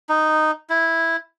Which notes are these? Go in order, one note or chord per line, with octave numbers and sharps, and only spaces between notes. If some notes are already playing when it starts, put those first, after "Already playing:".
D#4
E4